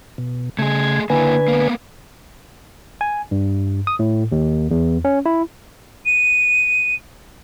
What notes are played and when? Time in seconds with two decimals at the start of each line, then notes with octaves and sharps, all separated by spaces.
0.18 B2
0.59 C#3 A3 G#4 G#6
1.10 D3 A#3 E4 B4 G#5
1.48 A#3 B3
3.01 G#5
3.31 G2
3.87 D#6
3.99 A2
4.32 D#2
4.71 E2
5.05 C#4
5.26 E4
6.06 D#7